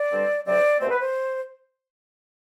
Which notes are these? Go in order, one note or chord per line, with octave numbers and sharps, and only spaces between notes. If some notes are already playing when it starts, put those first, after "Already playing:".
Already playing: D5
G2 D3 G3 C4
D2 C3 F#3 C4 D5
C2 B2 A3 C4 C5
B4
C5